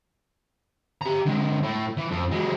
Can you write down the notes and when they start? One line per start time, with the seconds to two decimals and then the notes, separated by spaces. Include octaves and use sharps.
1.02 G4 A#5
1.26 D3 G#3
1.63 A2
1.98 E3
2.12 F2
2.32 F#3 G#3